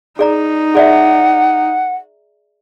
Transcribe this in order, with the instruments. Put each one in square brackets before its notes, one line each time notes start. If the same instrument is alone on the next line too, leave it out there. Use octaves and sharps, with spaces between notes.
[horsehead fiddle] D#4 [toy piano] G#4 D5 A#5
[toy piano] G#4 D5 E5 [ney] F#5